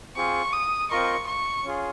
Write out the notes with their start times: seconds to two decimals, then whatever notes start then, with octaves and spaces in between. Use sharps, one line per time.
0.16 C4 F4 G#4 C#6
0.53 D#6
0.91 C4 F4 A#4 D#5 C#6
1.27 C#6
1.65 C#4 F4 G#4